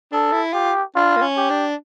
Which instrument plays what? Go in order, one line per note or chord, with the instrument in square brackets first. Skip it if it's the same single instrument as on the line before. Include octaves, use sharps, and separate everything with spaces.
[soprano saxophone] D4 [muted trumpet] A4
[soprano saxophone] E4
[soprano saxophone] F4 [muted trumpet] G4
[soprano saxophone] D4 [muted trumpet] F4
[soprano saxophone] A#3
C#4
[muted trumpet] G4
[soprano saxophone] D4